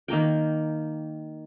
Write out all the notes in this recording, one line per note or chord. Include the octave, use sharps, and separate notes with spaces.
D#3 A#3 A#4 G5